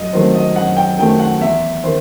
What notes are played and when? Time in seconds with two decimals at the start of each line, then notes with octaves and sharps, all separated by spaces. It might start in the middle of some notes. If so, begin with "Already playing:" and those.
Already playing: F#2 D#5
0.13 D#3 F#3 A3 C4 C5
0.35 D#5
0.56 F#2 F#5
0.77 G5
0.99 D#3 F#3 A3 C4 G5
1.19 F#5
1.41 E2 E5
1.83 D#3 C5